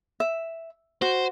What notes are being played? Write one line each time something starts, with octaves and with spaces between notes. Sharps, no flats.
E5
F#4 C5